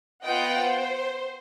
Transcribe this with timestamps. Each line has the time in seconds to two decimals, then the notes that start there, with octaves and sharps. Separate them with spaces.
0.24 B3 F4 D#5 F#5 G5
0.60 C5